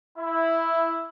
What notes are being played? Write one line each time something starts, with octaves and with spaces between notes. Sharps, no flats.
E4